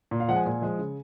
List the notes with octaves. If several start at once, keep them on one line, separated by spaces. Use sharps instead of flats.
A#2
F5
F3 G#3 F#5
G#5
A#2
F3 G#3
C#3